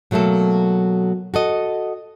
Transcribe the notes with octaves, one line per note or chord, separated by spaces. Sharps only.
B2 F#3 A3 A#3 A4
F#4 A4 D#5